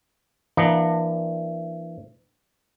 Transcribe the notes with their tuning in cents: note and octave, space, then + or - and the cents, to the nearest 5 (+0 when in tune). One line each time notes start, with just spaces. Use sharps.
E3 +35 A#3 +25 D4 +35